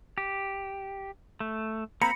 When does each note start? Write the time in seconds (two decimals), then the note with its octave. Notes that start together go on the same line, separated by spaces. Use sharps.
0.18 G4
1.40 A3
2.02 A#3 C4 A#5 B5 C#7